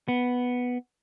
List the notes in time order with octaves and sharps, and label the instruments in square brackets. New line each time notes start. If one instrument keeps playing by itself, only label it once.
[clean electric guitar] B3